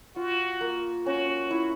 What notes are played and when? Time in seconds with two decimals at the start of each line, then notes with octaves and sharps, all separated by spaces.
0.16 F4 F#4
0.61 A#3
1.06 C#4 F#4
1.51 E4